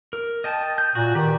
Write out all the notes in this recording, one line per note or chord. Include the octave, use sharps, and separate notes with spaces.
A#4
D#5 G5 A5
G6
A#2 F#4
D#3 G4 B4 D5